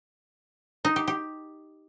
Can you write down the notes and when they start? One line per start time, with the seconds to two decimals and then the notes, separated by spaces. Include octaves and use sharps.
0.85 D#4
0.96 G4
1.08 G4